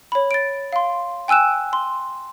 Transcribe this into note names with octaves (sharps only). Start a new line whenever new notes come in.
C#5 B5
A6 D7
F5 C6
G5 G#5 E6 F#6 E7
C6